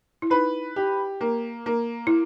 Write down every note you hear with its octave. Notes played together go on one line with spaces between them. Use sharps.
E4
D#4 B4
G4
A#3
A#3
E4